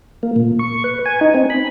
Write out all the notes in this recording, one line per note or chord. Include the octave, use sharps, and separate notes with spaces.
A#3
A#2
C#6
B4
G#5
D#4
C4
B5